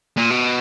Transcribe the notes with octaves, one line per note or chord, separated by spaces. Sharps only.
A#2
B2